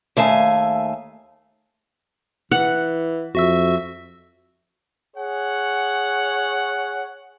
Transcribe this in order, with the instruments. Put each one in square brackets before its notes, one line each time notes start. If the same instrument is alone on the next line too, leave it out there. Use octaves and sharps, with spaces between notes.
[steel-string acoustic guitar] D#2 A3 E5 F5 G#5
[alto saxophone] E3 [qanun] F#5
[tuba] F2 [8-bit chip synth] F#4 E5 E6
[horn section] G#4 C#5 F#5